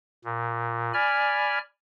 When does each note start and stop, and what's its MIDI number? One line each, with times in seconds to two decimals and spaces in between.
0.25 0.92 46
0.93 1.58 74
0.93 1.58 80
0.93 1.58 83
0.93 1.58 89